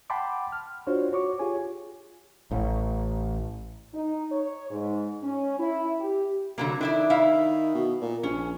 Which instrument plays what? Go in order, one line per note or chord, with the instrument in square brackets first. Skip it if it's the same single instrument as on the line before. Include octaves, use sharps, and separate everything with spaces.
[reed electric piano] F#5 G5 A5 B5 C6 D6
F6
D4 F4 F#4 C5 C#5
F#4 C#5 C#6 D6
F4 G4 G#4 C#5 G#5
[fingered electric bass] A1
[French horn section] D#4
C#5
G#2
C#4
E4
G4
[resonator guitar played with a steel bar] D3 F#3 A#3
[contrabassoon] D#3 [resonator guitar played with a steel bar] D4 E4 D5
[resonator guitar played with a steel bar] E4 F5
[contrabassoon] B2
A#2
[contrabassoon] A#1 [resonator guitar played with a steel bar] C#4